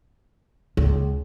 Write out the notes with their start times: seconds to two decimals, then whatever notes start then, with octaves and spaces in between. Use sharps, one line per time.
0.77 C#2